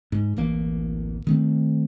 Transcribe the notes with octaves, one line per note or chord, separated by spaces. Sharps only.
G#2
D1 A1 E3 A#3
D#3 A3 C4